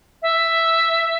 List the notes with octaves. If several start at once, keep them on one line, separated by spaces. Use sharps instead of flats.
E5